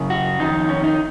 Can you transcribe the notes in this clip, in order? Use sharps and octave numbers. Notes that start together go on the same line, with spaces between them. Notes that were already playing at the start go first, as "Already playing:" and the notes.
Already playing: F#2 C#3
F#4
F2 D#3 D#4
C#4
D#4